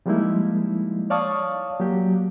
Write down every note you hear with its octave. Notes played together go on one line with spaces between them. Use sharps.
F3 G3 G#3 A#3 D#4 E4
C#5 D5 F5 A5 C#6 D#6
F#3 A#3 G4